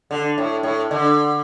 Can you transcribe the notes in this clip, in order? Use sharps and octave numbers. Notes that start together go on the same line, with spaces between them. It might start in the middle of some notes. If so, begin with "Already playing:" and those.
D3
A2
A2
D3